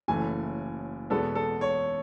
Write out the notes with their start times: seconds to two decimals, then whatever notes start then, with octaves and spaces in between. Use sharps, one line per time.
0.08 F#1 F#2 E3 A3 G#5
1.10 E2 B2 G#3 B3 A4
1.35 A4
1.61 C#5